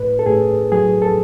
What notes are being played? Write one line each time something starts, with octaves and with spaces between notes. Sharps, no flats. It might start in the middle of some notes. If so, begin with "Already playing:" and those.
Already playing: A2 B4
A4
A2 G#4
F#3 G#4
A4